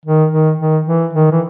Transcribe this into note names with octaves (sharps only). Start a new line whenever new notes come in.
D#3
D#3
D#3
E3
D#3
E3